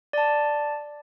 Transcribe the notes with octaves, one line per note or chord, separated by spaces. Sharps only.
D5 A5